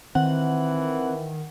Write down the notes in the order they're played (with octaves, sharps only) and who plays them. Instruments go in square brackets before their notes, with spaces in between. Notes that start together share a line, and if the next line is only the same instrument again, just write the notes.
[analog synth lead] D#3 [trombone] E3 [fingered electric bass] C4 [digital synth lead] F#5